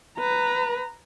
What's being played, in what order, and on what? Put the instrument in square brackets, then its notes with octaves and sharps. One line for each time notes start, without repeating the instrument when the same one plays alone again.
[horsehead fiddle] B4 A#5